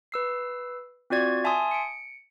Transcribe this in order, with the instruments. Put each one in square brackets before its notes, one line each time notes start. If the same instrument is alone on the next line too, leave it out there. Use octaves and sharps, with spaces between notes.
[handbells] B4 E6 C7
C4 F4 F#4 D5 G#6
E5 G#5 A5 C6 D#6
C#7 D7